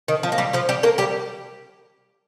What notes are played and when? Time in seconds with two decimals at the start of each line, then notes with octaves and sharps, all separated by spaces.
0.08 D#3
0.23 F3
0.32 A#3
0.38 G3
0.53 F3 F4
0.69 G3 G4
0.83 A#3 A#4
0.98 G3 G4